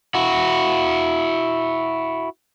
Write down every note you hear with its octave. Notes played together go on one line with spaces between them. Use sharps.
E4 F#4